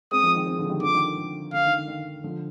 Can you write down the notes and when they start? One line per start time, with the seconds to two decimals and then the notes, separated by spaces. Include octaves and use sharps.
0.11 G#3 C4 D#6
0.23 F3 G#3
0.35 D#3
0.46 G#3 C4
0.59 D3 F3
0.70 D#3 G3
0.82 D3 F3 D6
0.95 D#3
1.17 D3
1.52 D3 F5
1.65 D#3
1.77 D#3
1.88 D#3
2.24 D3 F3